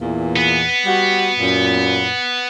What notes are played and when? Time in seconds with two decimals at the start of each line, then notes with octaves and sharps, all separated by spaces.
0.01 E2 A#2 E3
0.36 B3
0.86 G3 F#4
1.38 F#2 A#2